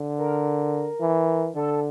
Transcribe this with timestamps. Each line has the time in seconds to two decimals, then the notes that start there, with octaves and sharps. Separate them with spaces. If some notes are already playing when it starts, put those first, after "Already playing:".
Already playing: D3
0.18 A#4
1.00 E3
1.55 D3 A4